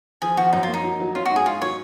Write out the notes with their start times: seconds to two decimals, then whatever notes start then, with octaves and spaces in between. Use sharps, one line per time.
0.22 F3 G#4
0.37 F3 F#4
0.53 F#2 D#4
0.63 F4
0.68 A#3
0.74 D#4
0.83 F#3
1.00 F#3
1.15 C#4 F4
1.25 F#4
1.30 G#2
1.36 G#4
1.46 G#2 F4
1.61 F#3 C#5